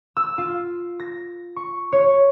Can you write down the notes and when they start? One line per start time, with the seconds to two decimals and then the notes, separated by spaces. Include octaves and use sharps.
0.17 E6
0.38 F4
1.00 A#6
1.56 C#6
1.92 C#5